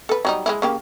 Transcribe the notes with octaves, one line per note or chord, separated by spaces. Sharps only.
A4 B4
F#3 G3 D#4
G#3 A#3 E4
C#3 A#3 G4